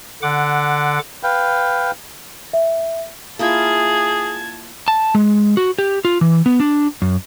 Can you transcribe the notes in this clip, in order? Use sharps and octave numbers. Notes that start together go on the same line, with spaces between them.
D3 F#5 D6
B4 F5 G5
E5
A#3 E4 F4 G#4 A5 G#6
A5
G#3
F#4
G4
F4
E3
B3
D4
F#2